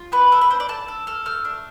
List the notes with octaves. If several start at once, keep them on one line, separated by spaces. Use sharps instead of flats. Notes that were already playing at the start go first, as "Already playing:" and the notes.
Already playing: F4
B3 B4
D4 A4
B4
D4 C5
D5
A4 A5
A4
A4 F6
A3 F6
D4